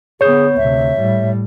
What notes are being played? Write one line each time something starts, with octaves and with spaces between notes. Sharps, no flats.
D3 B3 G#4 C#5 G6
D2 C3 E5
A2 G3